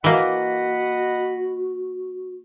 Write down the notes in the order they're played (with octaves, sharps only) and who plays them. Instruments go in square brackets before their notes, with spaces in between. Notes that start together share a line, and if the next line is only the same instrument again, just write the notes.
[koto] E3 A#3 [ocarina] F#4 [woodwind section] D#5 F#5 B5